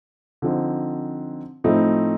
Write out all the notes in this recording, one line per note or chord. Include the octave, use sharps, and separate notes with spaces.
D3 F3 C4 D#4
A2 F3 A3 C4 D#4